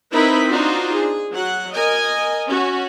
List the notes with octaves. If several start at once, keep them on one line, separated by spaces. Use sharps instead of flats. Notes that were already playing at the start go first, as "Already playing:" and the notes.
C4 D#4 E4 A#4 B4 B5
D4 D#4 F4 F#4 C5
G#4
F#3 F#5
A#4 D#5 G#5
C#4 F#4